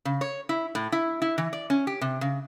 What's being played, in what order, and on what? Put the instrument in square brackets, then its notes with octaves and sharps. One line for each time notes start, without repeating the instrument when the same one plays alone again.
[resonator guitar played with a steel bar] C#3
C#5
E4
A2
E4
E4
E3
D5
C#4
G4
C3
C#3